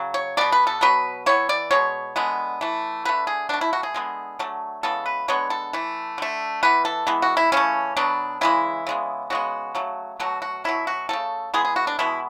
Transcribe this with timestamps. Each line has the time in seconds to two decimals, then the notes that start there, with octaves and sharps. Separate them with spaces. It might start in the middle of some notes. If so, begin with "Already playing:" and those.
Already playing: C#3 F#3
0.14 C#5
0.37 G#3 B3 D5
0.41 B2
0.52 B4
0.67 A4
0.81 B2 F#3 B3 B4
1.26 E3 B3 C#5
1.49 D5
1.71 B2 G#3 C#5
2.16 D3 G#3 B3
2.61 E3 A3
3.05 D3 A3 B4
3.27 G#4
3.49 B2 A3 D4
3.61 E4
3.73 F#4
3.83 G#4
3.94 D3 G#3 B3
4.39 D3 F#3 A3
4.83 C#3 E3 G#3 B3 A4
5.06 B4
5.28 D3 G#3 B3 C#5
5.50 A4
5.73 E3 A3
6.18 D3 A3
6.63 E3 B3 B4
6.85 A4
7.07 E3 G#3 B3
7.22 F#4
7.37 E4
7.52 C#3 E3 A3 C#4
7.97 B2 F#3 B3 D4
8.41 C#3 E3 G#3 E4
8.87 C#3 G#3 B3
9.30 C#3 G#3 B3 F#4
9.75 C#3 F#3 A3
10.20 B2 F#3 A3 F#4
10.42 F#4
10.64 B2 F#3 B3 E4
10.87 F#4
11.09 F#3 A3 A4
11.13 C#3
11.54 E3 G#3 B3 G#4
11.65 G#4
11.76 F#4
11.87 D4
11.99 B2 G#3 B3 E4